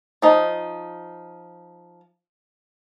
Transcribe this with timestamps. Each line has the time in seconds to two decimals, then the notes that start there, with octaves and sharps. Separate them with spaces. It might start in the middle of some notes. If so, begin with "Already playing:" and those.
0.22 F3 D#4